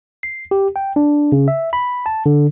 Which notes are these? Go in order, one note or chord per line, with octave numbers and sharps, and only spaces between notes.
C7
G4
G5
D4
C#3
E5
B5
A5
D3